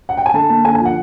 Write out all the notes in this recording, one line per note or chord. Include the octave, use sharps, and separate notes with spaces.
F#5
G5
G#5
D3 A5
A#3 A5
D3 G#5
G#5
F3 F#5